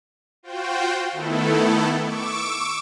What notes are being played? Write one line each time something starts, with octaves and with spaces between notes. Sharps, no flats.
F4 F#4 C5 G5
D#3 A3 B3 E4 A4
C#6 D6 E6 D7